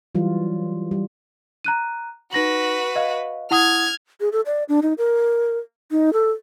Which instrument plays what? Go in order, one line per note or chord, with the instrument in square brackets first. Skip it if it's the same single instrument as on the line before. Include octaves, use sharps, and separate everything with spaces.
[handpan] E3 F#3 G3 F4
G3
[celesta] A#5 F#6 D#7
[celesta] D#4 A#6 F#7 [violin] F#4 B4
[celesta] D#5 F5
[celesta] E4 F#5 D#6 [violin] F6 G#6
[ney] G#4
A4
D5
D4
D#4
A#4
D#4
A4